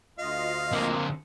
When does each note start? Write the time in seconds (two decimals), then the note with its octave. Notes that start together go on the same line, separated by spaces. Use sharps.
0.19 D2 F4 D#5 F5
0.73 D3 A#3 C4